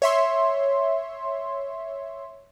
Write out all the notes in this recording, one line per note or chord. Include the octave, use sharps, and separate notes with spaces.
C#5 E5 C6